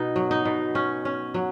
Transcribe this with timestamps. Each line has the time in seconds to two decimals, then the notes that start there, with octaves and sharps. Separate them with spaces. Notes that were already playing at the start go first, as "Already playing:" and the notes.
Already playing: B2 D#4
0.16 F#3
0.31 D#4
0.45 B2
0.75 C#4
1.05 C#4
1.34 F#3